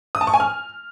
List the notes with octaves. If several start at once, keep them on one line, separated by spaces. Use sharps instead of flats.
D#6
A5
C#6
G#5
F6